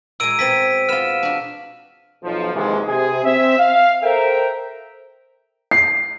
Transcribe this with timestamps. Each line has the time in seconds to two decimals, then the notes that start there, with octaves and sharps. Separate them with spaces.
0.20 A#2 G#3 E6 D7 D#7
0.39 B2 C4 G#5 B6 D#7
0.89 B3 F4 F6 E7
1.23 D4 F#4
2.24 B1 F3
2.53 D#2 G#2 C3 E3 F3 G#3
2.88 C3 G#4
3.24 C4 E5
3.59 F5
4.03 A4 A#4 C5 E5 G5 A#5
5.71 C7